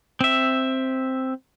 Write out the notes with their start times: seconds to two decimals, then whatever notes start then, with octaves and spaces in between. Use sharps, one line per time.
0.21 C4 E5